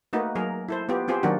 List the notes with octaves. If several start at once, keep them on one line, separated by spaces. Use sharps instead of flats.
A3 A#3 D#4 F#4 B4
F#3 A#3 G#4 A#4
E4 A4 C5
B3 F4 G4
C4 F4 G4 G#4 C5
D#3 F#3 A#3 D4 F#4